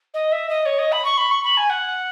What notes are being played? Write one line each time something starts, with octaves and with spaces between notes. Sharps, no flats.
D#5
E5
D#5
C#5
D#5
B5
C#6
B5
C#6
B5
G#5
F#5